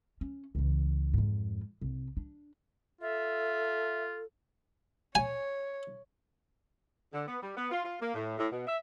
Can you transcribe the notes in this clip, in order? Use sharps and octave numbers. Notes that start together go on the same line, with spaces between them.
C#4
C#2 E3
F2 G#2
C2
D4
F4 A4 E5
C#5 G#5
D3
B3
G3
B3
F4
F4
A#3
A2
A2
B2
E5